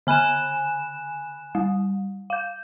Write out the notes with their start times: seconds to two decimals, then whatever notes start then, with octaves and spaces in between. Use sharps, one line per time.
0.07 D3 G#5 B5 F#6 E7
1.55 G3
2.30 F5 G6